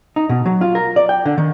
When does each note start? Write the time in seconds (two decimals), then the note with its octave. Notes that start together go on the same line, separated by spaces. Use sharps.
0.16 D#4
0.29 B2
0.46 F#3
0.61 F4
0.75 A#4
0.96 D5
1.09 G5
1.25 D3
1.38 D#3